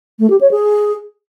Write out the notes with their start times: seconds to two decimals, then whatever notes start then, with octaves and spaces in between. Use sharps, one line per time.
0.20 A3
0.30 G4
0.41 C#5
0.51 G#4